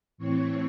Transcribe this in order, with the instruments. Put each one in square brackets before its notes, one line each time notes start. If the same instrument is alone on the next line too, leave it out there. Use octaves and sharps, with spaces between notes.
[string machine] A2 E3 C4 C#5